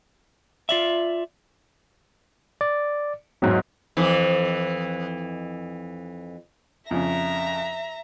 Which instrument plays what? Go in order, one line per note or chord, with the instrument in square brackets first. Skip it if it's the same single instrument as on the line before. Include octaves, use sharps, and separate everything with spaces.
[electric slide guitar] F4 D5 E5
[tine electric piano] D5
[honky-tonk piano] E2 G#2 [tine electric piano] F#3
[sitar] F2 E3
[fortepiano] F2 C#3 [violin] E5 A#5